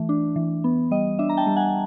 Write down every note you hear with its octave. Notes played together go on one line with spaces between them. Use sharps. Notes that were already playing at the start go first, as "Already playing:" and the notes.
Already playing: E3 A3
D4
E3
B3
G3 D#5
D4 E5
A#5
G5 A5
G3
F#5 G#5